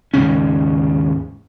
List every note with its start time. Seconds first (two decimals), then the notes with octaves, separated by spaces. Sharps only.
0.14 D#2 G#2 C#3 C#4